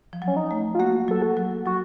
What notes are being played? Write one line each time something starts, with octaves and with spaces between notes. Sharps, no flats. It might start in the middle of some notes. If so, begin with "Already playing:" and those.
F3
F#3
C#4
D#4
A3
F4
A#3 F#4
F#3 A4
F#4
F#3
F#3 F#4